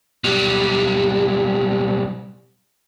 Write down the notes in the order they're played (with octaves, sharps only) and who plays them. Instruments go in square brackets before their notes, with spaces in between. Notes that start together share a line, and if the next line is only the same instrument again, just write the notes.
[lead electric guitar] B1 G3